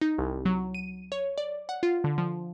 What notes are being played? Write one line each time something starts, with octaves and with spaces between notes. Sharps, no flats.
D#4
C2
F#3
D#7
C#5
D5
F#5
F4
D3
F3